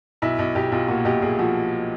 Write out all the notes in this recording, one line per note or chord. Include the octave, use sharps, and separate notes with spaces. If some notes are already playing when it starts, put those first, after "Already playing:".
B1 E4
B1
B1 G4
B1 F4
A#2 F#4
B1 G4
B1 G#4
F3 F#4